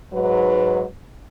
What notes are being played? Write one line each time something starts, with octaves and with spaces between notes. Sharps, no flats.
G#2 F#3 B4